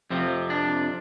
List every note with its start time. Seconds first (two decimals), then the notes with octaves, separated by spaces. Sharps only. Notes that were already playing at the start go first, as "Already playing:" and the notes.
0.10 F2 C3 F3 C4
0.50 D4